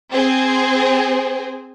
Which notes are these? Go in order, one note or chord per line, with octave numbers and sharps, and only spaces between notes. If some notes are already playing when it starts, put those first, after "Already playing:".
C4 G#4 C5